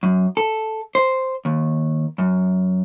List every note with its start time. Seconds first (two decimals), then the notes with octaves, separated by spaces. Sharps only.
0.03 F#2
0.37 A4
0.95 C5
1.45 D#2
2.18 F#2